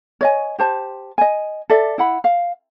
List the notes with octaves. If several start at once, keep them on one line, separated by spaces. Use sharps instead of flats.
C#5 D#5 G#5
G4 C5 A5
D#5 G#5
A4 D5 E5
E4 F#5 B5
F5